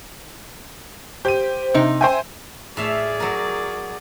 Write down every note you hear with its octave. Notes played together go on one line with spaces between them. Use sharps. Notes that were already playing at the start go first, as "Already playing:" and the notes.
G4 C5 D#7
C3 D#4
C5 E5 G5 G#5
A2 G#4 D5 E5 F5
F#3 A#4